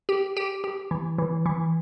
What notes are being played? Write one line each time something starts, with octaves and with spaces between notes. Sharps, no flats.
G4
G4
G4
E3
E3
E3